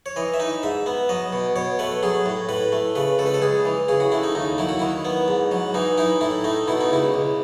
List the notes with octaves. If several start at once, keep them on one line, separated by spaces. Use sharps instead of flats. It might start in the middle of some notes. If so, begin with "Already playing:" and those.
C#5
E3 D#5
E5
D#4 D#5
G#2 E5
B3
F#3 D#5
B2
B2 C#5
A3 B4
F#3 G#4
A2
A2 B4
A3
C#3 B4
C#2 A4
B4
A4
C#2 G#4
E3
C#3 G#4
F#4
A3 E4
D#4
D#2 D#4
F#3 E4
F#4
D#3 E4
B3
G#2
F#3
E3 D#4
D#4 E4
A2 E4
A3 D#4
B2 E4
D#4
C#2 E4
C#2